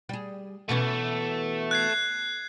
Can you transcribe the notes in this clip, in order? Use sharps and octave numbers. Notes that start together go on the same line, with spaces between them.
G3 G#4
B2 E3 A3 C#4
F#6 G#6 C7